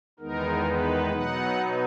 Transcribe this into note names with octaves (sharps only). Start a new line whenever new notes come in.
E2 D#3 G#3 B3 D#4 A#4
B4
B2 F#3 B3 D#4 F#5